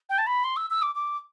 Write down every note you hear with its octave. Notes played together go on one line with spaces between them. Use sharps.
G5
A5
B5
C6
E6
E6
D6
D6